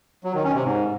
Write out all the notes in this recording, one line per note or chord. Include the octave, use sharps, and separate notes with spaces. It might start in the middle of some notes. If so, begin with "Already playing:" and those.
F#3
D#3
C#4
C3
G#2